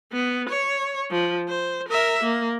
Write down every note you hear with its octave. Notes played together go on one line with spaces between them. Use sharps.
B3
C#5
F3
C5
A#4 E5
A#3